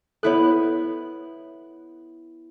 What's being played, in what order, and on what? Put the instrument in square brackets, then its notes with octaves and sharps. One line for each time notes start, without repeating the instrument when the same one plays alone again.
[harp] B3 E4 F#6 [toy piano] A4 C#5